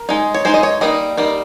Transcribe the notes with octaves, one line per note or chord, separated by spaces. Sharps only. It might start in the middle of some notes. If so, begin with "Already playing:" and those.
Already playing: A#4
G#3 D#4
C#5
G#3 D#4 C5
D#5
C#5
G3 A#3 D#4 D#5
G3 A#3 D#4